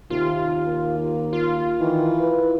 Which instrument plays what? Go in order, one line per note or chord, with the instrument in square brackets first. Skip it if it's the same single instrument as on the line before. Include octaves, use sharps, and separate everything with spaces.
[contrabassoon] D#2 [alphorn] C3 [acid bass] F4
[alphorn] A#3
[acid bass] F4
[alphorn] D#3 [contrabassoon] E3
[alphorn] B4